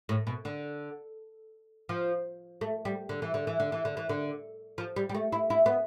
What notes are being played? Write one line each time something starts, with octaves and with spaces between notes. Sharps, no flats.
A2
B2
D3
F3
A3
G3
D3
E3
D3
E3
D3
E3
D3
E3
D3
F3
G3
G3
A3
E4
E4
B3